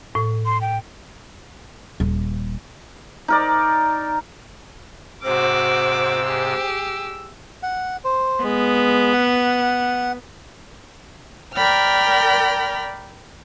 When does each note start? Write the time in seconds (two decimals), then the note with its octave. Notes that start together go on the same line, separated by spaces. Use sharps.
0.15 A2
0.46 C6
0.61 G5
2.00 D#1
3.28 D#4 A#4 D5
5.24 G#2 C3 F#4 C5 D6 E6
6.25 G4 G#4
7.63 F#5
8.04 C5
8.43 G#3 B3
9.13 F#5
11.55 A#4 D5 G5 B5 F6